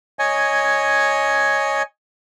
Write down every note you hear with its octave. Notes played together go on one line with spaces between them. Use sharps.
C#5 D#5 G#5